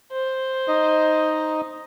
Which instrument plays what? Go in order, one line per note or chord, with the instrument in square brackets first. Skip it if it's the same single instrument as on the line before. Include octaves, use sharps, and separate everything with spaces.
[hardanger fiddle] C5
[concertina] D#4 D#5